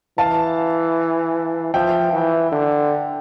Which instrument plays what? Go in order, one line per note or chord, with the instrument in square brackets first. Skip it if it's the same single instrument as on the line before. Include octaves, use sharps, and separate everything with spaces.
[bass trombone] E3 [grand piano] F5 A5
[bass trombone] F3 [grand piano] E5 G5
[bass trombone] E3
D3